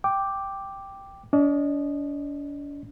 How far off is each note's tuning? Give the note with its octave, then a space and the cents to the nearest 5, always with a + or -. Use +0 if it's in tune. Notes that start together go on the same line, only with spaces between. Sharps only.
G5 +0 D6 +0
D4 -45 D#5 -15